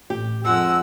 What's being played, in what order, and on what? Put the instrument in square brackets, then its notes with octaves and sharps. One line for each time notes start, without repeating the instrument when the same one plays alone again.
[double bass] A1 [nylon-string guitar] G4
[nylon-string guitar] F2 [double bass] F3 [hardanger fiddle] G#3 F#5 [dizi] E6